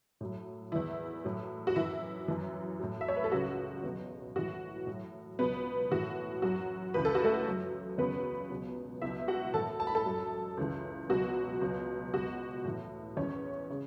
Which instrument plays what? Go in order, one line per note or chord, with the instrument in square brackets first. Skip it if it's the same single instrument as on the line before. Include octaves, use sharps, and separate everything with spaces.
[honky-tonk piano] A2 F#3
E2 E3 E4
A2 F#3
F#4
F#2 E3 E4
F#2 E3
A2 F#3
E5
C#5
B4
A4
C#2 C#3 F#3 F#4
E2 B2 F#3
A2 E3 F#4
A2 F#3
C#2 B2 F#3 B3 B4
A2 E3 F#4
F#2 F#3 F#4
C#2 C#3 E3 B4
A4
F#4
A3 A4
F#2 F#3
E2 C#3 F#3 B3 B4
C#2 B2 F#3
C#2 B2 F#3 E4 E5
F#4 F#5
A2 E3 A4 A5
A5
B5
A4 A5
F#2 F#3
C#2 C#3 E3
C#2 B2 F#3 F#4
C#2 B2 F#3
C#2 B2 F#3 F#4
A2 E3
E2 E3 C#4 C#5
C#3